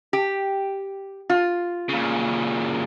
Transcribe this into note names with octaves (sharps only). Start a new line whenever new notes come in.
G4
F4
A#2 C#3